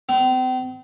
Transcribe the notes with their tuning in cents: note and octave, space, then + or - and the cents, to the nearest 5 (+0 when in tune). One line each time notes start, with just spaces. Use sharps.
C4 -40